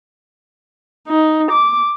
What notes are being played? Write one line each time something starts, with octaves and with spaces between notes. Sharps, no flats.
D#4
D6